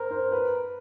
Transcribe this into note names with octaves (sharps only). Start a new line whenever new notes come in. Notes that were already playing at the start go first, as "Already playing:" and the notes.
Already playing: A#4 C5
C5
B4